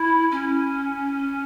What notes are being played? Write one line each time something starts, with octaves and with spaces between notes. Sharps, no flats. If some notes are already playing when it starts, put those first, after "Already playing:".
Already playing: E4
C#4